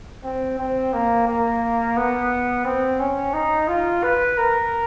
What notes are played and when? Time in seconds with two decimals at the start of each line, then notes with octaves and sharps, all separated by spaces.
0.24 C4
0.59 C4
0.93 A#3
1.28 A#3
1.97 B3
2.65 C4
2.99 C#4
3.33 D#4
3.68 F4
4.03 B4
4.38 A#4